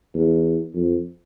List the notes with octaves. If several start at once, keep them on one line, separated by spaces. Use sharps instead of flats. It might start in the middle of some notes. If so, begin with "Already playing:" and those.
E2
F2